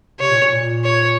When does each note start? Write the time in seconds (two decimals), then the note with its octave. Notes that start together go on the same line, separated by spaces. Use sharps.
0.20 C3 C#5
0.30 A#2
0.41 A#2
0.53 A#2
0.85 C#5